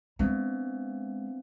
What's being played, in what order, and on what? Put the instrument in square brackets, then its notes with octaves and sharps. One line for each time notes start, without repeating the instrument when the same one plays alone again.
[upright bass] G#3 [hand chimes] B3 C4 D4